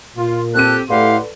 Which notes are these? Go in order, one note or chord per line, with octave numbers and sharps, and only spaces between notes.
A#2 F4
C4 G4 A4 F#6 D#7
A2 G4 A4 B4 D5 F5 F#5 C6